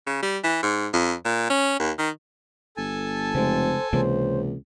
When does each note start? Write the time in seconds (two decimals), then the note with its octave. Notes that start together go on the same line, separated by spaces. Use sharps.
0.07 C#3
0.23 G3
0.44 E3
0.63 G#2
0.93 F2
1.25 A#2
1.50 C#4
1.80 D#2
1.98 D#3
2.77 G1 A4 G#5 A5
3.35 F1 C#3 G#3 C5
3.93 C#2 C3 E3 A#3 C5